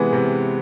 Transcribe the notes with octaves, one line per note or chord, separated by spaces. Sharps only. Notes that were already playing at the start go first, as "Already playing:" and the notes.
Already playing: C3 E3 G#3 B3
C3